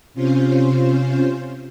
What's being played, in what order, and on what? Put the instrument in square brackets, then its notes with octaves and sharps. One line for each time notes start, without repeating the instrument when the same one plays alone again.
[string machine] C3 C#4 F4 C5